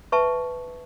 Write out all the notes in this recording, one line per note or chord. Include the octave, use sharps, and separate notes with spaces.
B4 E5 A5 C#6